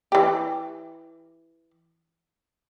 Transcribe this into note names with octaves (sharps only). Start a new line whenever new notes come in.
E3 G4